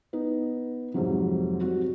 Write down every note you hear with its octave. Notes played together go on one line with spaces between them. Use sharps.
B3 D#4
F2 G#2 C3 F#3
G3 C4 F#4